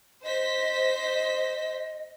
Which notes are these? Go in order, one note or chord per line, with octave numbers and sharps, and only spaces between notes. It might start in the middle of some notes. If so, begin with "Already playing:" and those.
C5 D#5 B6